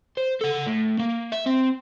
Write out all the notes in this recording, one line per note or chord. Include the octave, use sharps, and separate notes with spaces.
C5
A4 F#5
A2
A#3
E5
C4